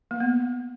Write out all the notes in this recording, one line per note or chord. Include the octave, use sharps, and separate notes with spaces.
A#3
B3